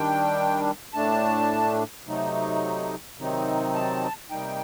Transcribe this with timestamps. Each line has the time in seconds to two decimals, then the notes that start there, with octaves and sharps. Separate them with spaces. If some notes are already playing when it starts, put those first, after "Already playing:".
Already playing: D#3 G3 D4 G5
0.94 A2 A3 D4 A5
2.06 C3 F#3 A3 D#4
3.18 C3 D#3 F#3 C4 D#4
3.74 A5
4.30 C3 G3 A#3 D#4 G5